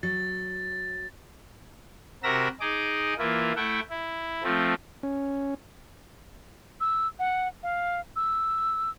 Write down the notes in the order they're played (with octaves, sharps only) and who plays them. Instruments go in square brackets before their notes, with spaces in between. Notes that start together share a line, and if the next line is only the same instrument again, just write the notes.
[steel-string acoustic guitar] F#3 [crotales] A6
[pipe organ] C3 F#4 A#4 B5 E6 A#6
D#4 G#4 D#5 D6
E3 A#3 E4 F4
A3 E4 E5 F#5 G5
E4
F3 A3 C4
[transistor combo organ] C#4
[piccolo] E6
F#5
F5
E6